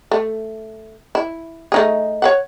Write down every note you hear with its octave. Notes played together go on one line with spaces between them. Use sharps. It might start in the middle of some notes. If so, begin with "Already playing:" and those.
A3
E4
A3 D#4 G#4
C#5 F5 F#5